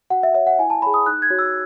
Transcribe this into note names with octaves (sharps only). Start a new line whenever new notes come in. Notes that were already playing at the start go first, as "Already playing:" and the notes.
F#4 F#5
E5
C#5 E5
F#5
E4 G#5
A5
G#4 C#5 B5
D#6
D#4 F#6
G#6
F#4 C#5
E6